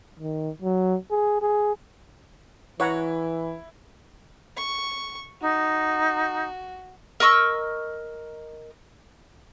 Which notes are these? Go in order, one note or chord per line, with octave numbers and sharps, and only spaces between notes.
D#3
F#3
G#4
G#4
E3 E4 B4 C#5 F#5 A#5
C#6
D#4 F#4
A#4 D#5 C#6 E6